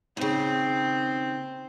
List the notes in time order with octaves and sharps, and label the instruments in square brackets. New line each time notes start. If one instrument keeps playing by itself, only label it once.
[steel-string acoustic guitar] D#2 C#3 [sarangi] C4